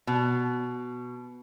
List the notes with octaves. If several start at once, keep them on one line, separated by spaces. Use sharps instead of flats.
B2